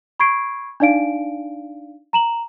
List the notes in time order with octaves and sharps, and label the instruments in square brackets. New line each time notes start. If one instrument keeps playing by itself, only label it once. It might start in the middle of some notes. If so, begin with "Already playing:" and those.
[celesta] B5 C#6 G#6 C7 D7
D4 D#4 D5 F5 D7
A#5 E7 F#7